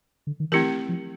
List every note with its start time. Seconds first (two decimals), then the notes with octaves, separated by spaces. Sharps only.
0.27 D3
0.40 D#3
0.52 E3 A3 C4 E4 G4 A#4
0.89 F3